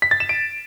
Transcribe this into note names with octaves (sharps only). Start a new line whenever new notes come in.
B6
A6
E7
D7